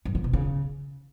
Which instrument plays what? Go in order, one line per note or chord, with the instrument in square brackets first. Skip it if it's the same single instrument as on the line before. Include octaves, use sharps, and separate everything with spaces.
[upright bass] G2
D3
B2
C#3